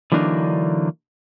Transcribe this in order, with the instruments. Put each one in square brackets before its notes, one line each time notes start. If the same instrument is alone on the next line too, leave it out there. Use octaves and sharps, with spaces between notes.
[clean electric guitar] D3 E3 F#3 A#3 D4 D#4